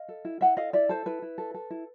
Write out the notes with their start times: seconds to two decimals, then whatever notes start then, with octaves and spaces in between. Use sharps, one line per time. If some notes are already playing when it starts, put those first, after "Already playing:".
Already playing: D#5 F5
0.09 A4
0.25 E4
0.41 E4 E5 F#5
0.57 A4 D#5 F5
0.73 E4 D5 E5
0.89 A4 C5
1.06 E4 B4
1.22 E4
1.38 A4
1.54 A4
1.70 E4